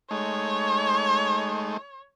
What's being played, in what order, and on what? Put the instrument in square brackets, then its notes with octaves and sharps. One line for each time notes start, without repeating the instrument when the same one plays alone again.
[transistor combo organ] G#3 A3 D#4 [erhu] C#5